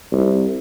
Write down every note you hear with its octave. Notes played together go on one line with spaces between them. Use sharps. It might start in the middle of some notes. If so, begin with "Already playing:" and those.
C2